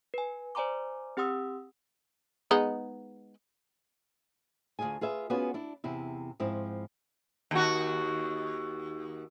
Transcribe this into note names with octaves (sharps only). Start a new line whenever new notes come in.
B4 G#5
C5 D5 G#5 A#5 C6 D6
C4 G4 F#5 C6 D#6 E6
G#3 B3 D#4
D2 B2 F4 G#4 G#5
F4 G#4 B4 E5
B3 C#4 F4 F#4 G#4 B4
D4 E4
E2 C3 E4
G#2 F3 C4 E4
D#2 F#4